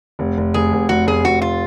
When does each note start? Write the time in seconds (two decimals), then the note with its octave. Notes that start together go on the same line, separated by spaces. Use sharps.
0.19 F1
0.37 F1
0.54 F1 G#4
0.73 F1
0.89 F1 F#4
1.07 F1 G#4
1.24 F1 F#4
1.42 F4